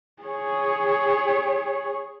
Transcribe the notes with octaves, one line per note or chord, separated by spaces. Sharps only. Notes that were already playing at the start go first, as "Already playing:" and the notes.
G#4 C#5